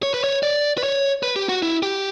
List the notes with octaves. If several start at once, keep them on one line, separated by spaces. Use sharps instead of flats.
C#5
B4
C#5
D5
B4
C#5
B4
G4
F#4
E4
G4